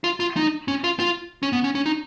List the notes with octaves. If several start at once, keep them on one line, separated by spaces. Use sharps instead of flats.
F4
F4
D#4
C#4
F4
F4
C#4
B3
C#4
C#4
D#4